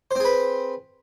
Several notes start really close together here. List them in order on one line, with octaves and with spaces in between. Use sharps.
C5 C4 G#4 B4